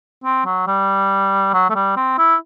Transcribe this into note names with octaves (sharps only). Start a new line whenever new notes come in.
C4
F#3
G3
F#3
A3
G3
C4
E4